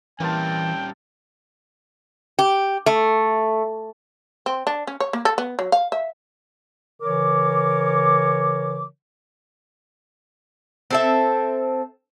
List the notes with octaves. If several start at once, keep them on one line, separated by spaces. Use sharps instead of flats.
E3 G3 A#3 C4 C#4 G5 A5
G4
A3
C4
D4
C#4
C#5
A#3
A4
B3
F#3
F5
E5
C#3 E3 A#4 C#5 D6
C4 A4 E5